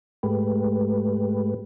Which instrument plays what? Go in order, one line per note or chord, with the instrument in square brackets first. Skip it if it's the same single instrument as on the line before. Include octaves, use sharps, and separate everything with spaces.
[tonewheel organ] G#2 G#3 A3 G4 B4